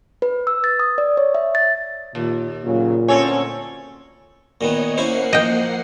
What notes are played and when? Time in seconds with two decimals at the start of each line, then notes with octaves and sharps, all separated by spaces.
0.22 B4
0.47 E6
0.64 A6
0.79 D#6
0.98 D5
1.17 C#5
1.35 E5
1.55 A6
2.15 D#2 A#2
2.64 A#2 C#3 F#3
3.08 D2 C4 C#4 A4 C#5 G#5
4.61 A#2 D#3 B3 C#5 D#5
4.97 A#3 C#4 E4 C5 F#5 C7
5.33 F3 D#5 G5